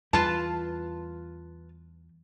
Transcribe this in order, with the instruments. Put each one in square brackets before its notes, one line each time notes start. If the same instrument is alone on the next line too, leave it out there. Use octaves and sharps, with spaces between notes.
[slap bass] E2 G3 [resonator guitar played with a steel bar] F4 B4 A5